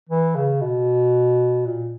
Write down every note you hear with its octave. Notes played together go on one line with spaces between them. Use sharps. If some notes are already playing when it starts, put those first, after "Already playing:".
E3
C#3
B2
A#2